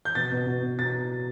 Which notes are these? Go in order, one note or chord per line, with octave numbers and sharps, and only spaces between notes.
G6
B2 A6
B2
B2
B2
B2 A6